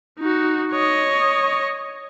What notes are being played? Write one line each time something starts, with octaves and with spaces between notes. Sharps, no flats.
D#4 F#4
C#5 D#5